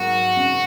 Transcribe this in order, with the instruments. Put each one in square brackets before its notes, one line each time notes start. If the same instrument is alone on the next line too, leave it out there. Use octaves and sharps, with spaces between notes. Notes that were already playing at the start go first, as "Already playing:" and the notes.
Already playing: [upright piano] G#2 F#3 A#3 [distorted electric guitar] F#4
[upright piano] G#1 F#2 C#3